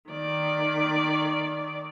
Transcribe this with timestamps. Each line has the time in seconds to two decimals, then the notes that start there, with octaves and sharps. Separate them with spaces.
0.10 D#3 D5